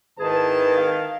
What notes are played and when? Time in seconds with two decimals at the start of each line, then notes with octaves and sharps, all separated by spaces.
0.19 G#1 D#3 E4 G#4 B4 A5
0.77 F5